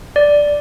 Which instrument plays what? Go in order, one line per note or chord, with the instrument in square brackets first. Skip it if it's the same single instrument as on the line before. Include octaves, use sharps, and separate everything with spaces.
[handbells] D5